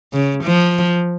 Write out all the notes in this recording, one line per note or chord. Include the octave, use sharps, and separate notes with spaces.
C#3
F3